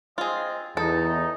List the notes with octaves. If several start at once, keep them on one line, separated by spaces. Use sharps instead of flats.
C4 F4 G#4 D#5
E2 D#4 A4